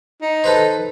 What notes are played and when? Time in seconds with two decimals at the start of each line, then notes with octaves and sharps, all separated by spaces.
0.22 D#4
0.44 A4 B4 C5